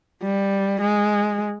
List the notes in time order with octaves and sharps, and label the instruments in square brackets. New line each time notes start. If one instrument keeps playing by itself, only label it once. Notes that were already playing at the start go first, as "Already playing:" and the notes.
[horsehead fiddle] G3
G#3